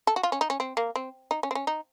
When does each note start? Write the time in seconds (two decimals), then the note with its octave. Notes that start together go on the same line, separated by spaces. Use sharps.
0.07 A4
0.16 F#4
0.23 F4
0.32 C#4
0.41 D#4
0.50 C#4
0.60 C4
0.77 A#3
0.96 C4
1.31 D#4
1.43 C#4
1.51 C4
1.55 C#4
1.67 D#4